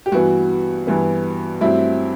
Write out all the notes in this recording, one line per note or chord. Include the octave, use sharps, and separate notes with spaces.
G4
G2 E3 B3 F#4
G2 E3 B3
G2 F#3 A3 C4 E4